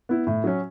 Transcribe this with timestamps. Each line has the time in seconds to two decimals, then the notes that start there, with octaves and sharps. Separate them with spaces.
0.09 B3 E4
0.27 A2
0.44 F#3 C#4